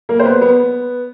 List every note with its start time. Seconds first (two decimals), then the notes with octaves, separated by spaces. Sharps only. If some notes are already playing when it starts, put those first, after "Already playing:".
0.09 A#3 A#4
0.19 C5
0.25 B3 B4
0.41 B3 B4